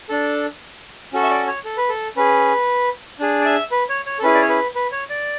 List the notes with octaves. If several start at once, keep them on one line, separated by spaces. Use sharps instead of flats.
D4 A4
C#4 F#4 A4
E5
D5
C#5
A4
B4
A4
C#4 G#4 B4
D4 G#4
D5
E5
B4
C#5
C#5
A4
C#4 E4 G#4 B4
D5
C#5
B4
B4
C#5
D5